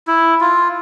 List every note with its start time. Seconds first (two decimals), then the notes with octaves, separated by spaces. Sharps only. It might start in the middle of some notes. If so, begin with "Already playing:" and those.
0.07 E4
0.41 F4